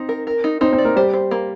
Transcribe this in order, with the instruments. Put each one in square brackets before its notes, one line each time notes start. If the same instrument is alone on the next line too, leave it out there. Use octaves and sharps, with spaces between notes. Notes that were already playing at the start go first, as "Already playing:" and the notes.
Already playing: [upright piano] C4 [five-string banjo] D#4
[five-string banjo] A#4
A#4
D#4
[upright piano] C4 C5 [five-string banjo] D#4
[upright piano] C4 C5
[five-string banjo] D5
[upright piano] A#3 A#4
[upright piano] G3 G4 [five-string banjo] C5
[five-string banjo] C5
A#3